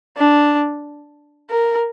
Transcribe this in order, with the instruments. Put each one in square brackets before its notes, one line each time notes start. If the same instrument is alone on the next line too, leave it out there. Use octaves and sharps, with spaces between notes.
[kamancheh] D4
A#4